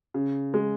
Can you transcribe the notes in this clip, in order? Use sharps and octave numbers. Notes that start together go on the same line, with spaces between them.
C#3
G#3